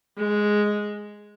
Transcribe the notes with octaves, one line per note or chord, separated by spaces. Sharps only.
G#3